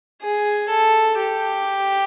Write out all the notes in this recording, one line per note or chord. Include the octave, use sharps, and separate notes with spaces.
G#4
A4
G4